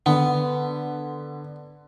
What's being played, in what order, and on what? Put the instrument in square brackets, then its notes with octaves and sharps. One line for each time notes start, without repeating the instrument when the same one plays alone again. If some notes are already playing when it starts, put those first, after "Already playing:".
[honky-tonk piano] D3 [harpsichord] B3